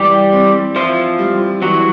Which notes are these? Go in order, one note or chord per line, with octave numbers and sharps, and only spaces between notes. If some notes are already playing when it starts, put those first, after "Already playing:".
Already playing: E3 G3 G4
C4
F3 E4 F4
G3
E3 F#3 F#4